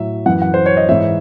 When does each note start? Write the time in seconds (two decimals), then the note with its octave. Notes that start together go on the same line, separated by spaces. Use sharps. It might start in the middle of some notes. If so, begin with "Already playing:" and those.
Already playing: A2 F#3 E5
0.26 F#2 E3 F#5
0.42 F#5
0.54 C5
0.66 C#5
0.77 D#5
0.89 G#2 E3 E5